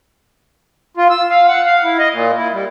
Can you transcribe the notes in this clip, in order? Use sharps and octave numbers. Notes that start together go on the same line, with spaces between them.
F4
E6
F5
F#5
F5
E4
D#5
A#2
E4
G3